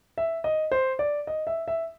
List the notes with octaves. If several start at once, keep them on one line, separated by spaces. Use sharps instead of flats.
E5
D#5
C5
D5
D#5
E5
E5